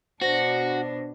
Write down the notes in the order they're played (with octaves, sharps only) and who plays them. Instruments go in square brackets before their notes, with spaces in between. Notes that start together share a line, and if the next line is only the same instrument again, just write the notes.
[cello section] B2 D4 [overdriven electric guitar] F#4 [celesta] C5 A#6